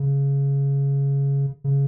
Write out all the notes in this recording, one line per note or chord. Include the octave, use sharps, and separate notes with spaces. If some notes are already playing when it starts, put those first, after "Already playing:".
Already playing: C#3
C#3